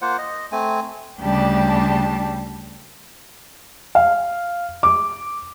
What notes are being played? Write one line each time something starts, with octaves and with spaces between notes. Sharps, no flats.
A#3 F4 C5 F#5
D#5
A3 C4 G#5
D2 C#3 G3 D4 G4 A5
F5
D6